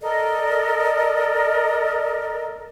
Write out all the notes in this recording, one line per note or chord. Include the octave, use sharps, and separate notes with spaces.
A4 A#4 D5 D#5